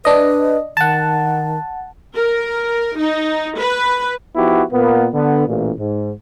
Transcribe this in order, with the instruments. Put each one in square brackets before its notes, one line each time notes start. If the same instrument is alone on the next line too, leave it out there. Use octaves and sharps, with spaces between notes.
[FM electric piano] D4 D#5 [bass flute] B4
[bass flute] D#3 [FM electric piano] F#5 A5
[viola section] A#4
D#4
B4
[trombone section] F3 B3 D#4 E4 F#4 G4
A#2 A#3 B3
D3 B3
A1 A#2
G#2